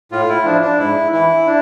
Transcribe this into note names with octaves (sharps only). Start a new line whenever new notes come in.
A2 F4
E4
F3 D4
D4
G#2 E4
E3 E4
D4